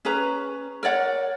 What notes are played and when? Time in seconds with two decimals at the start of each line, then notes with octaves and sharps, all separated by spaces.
0.05 C#4 G#4 B4 A#5
0.83 A#4 C#5 D5 F#5